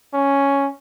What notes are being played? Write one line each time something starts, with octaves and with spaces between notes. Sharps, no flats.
C#4